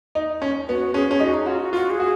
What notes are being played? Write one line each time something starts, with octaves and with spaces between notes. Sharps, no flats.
D#4
C#4
B3 F#4
C#4 G#4
C#4
D#4 F#4
D#4
F4 F#4
F#4
F4 F#4
G#4
F#4